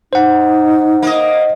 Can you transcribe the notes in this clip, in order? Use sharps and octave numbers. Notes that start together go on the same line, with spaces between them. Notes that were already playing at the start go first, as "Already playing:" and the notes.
D#4 C5 F#5
A#3 D#5